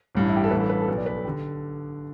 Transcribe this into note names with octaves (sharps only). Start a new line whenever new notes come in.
A1 G2 E3
E4
G4
A4
A1 G2 E3 B4
A4
B4
A4
B1 B2 B4
D5
B4
A4
D3 G4